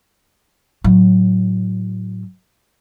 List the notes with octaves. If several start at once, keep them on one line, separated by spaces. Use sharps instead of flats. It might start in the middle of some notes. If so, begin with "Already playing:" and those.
A2 F#3